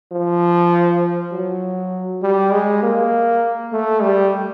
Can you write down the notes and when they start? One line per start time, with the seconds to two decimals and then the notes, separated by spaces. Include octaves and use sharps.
0.12 F3
1.32 F#3
2.23 G3
2.52 G#3
2.83 A#3
3.73 A3
4.02 G3